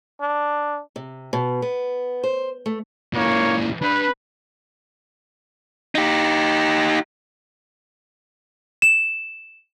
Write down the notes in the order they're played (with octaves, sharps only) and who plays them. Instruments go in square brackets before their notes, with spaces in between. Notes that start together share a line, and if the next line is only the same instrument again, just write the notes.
[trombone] D4
[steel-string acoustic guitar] C3
B2
B3
C5
A3
[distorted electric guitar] A#2 E3 [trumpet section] A#3 C#5
[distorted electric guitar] D4 B5 [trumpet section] B4
[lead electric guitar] D#4 G4
[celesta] E7